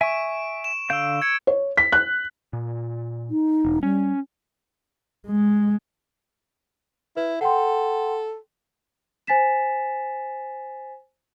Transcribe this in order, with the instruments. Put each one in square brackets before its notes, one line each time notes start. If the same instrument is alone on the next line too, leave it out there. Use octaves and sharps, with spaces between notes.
[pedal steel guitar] E5 G#5 [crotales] C#6 D7
[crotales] E7
[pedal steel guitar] D3 F5 G6 [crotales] E6 D7
[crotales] G#6 C#7
[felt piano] C#5
B6
F#6
[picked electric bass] A#2
[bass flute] D#4
[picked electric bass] E1
[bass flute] G3 [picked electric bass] C#4
[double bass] G#3
[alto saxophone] E4 [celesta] B4
[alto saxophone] A4 [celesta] F#5 G5 C6
[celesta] C5 G#5 A6 B6 E7